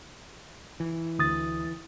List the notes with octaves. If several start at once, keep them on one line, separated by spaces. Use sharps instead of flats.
E3
D2 D#6 A6